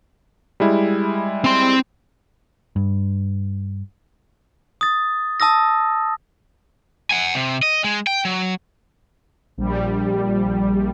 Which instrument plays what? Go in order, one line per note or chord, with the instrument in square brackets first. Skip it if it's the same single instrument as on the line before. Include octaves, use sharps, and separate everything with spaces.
[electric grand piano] G3 G#3 E4
[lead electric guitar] C4 C6
[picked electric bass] G2
[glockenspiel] D#6 A6
A5 D#6 E6 A#6
[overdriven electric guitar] F#5 G#5
C3
D#5
G#3
G5
F#3
[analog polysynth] A#1 G3